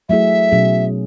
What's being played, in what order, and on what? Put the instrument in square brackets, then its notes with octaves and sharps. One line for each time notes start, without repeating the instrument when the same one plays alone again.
[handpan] F#3 A3 E4 G#4 [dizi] E5
[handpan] B2 F#3 C#4 G#4